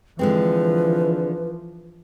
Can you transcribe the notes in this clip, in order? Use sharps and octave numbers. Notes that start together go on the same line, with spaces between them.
D3 E3 F3 G#3 C4 B4